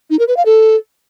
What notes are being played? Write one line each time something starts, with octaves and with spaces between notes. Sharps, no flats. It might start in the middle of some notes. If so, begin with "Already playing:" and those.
D#4
A#4
B4
F5
A4